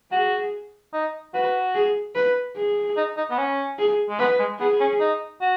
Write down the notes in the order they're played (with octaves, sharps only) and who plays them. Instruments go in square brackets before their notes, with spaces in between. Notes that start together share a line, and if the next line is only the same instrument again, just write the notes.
[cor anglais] F#4 [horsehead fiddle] G#4
[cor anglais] D#4
[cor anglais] F#4 [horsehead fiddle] B4
[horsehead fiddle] G#4
B4
G#4
[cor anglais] D#4
D#4
B3
C#4
[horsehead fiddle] G#4
[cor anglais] G#3
[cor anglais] B3 [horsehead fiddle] B4
[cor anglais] G#3
[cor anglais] B3 [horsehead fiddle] G#4
[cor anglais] C#4
D#4
F#4